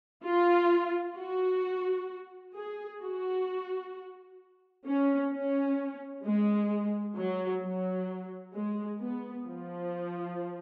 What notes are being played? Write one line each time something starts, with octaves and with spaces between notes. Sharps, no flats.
F4
F#4
G#4
F#4
C#4
C#4
G#3
F#3
F#3
G#3
B3
F3